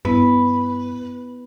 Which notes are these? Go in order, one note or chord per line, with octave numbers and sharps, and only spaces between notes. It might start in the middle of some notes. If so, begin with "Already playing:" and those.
G2 B3 E4 B4